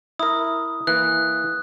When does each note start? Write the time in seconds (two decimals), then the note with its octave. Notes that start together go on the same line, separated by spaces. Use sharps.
0.19 E4 A#4 D#6
0.87 E3 A#3 F#6